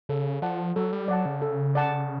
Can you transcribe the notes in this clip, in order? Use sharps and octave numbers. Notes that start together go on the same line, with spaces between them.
C#3 A4
F3 D5 F#5 A5
F#3 A4
G3
F#3 D5 F#5 A5
C#3
A4
D5 F#5 A5